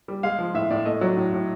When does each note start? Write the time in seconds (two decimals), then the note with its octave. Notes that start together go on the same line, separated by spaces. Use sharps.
0.08 G3
0.23 G#3 F5
0.39 F3
0.54 A2 E5
0.70 A2 D5
0.85 A3 D#5
1.01 F#3 D5
1.17 A2
1.33 A2